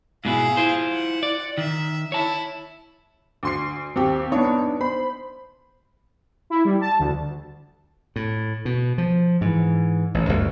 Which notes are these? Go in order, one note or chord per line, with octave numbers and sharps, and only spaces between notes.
G#2 B2 E4 G#4 F5
E4 F4 C5
F#5
D5
D#3 E5
E4 C#5 A5
D2 C6 C7
D#2 C4 G4
B3 D4 D#4 C#5
C5 B5
E4
G3
A5
D2
A2
B2
F3
G#2 E3
A1
G1 D2 G2